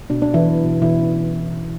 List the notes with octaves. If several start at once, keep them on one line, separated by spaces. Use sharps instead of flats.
B2 D4
D4
B3
E3 E4
F#3
B2
B2 E3 E4
C#4